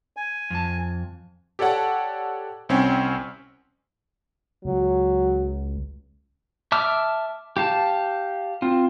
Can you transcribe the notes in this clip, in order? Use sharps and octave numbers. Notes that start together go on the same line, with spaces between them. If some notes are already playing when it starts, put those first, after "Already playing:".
G#5
F2 A5
G4 A4 C#5 D5 F#5 A5
C2 C4 C#4 G5 G#5
C#2 F#3
E5 A5 D6 E6 F6
G4 F5 A5
C4 F4